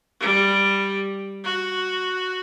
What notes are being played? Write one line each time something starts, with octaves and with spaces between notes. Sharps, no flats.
G3
F#4